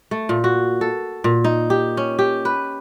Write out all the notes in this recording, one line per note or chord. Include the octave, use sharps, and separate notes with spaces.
A3
A#2
F#4
A4
A#2
D#4
G4
C#4
G4
B4